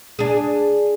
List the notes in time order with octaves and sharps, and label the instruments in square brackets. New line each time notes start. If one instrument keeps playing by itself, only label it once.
[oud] D4 G#4